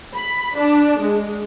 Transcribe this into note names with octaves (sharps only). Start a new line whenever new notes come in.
B5
D4
G#3